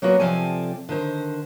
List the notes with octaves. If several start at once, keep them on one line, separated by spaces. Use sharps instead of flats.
F#3 A#3 B3 F#4
C3 F3 C4 A4 D5 G#5
D3 D#3 C5